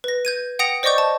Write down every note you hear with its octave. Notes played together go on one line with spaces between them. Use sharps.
B4 A#6
G6 G#6 D#7
F#5 G5 D#6 A#6 C#7 F7
C5 D5 D#5 C#6 D6 G6
A5